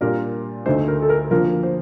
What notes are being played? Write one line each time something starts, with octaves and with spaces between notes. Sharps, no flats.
A#2 G3 D4 F4 A#4
D2 D3 A3 D#4 C5
A#4
A4
A#4
D3 F3 A#3 F4 A#4
C5